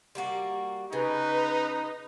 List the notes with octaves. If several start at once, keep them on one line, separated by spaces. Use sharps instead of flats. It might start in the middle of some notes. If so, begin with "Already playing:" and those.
G3 A#3 F#4
C#3 D#4 B4